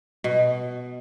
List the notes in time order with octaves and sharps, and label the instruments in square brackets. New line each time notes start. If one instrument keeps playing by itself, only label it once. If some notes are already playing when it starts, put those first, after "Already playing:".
[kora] B2